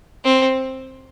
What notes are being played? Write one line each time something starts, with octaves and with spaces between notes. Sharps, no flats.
C4